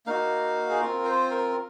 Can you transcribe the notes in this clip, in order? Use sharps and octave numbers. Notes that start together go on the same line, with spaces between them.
A#3 D#4 F#4 F5
G#4
C4 F4 A#4
C5
A#4